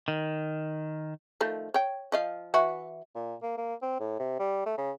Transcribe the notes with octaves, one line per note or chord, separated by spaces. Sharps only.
D#3
D#3 F3 A3
C#5 G5
F3 D#5 F5
E3 E4 F#4
A#2
A#3
A#3
C4
A2
C3
G3
A3
C#3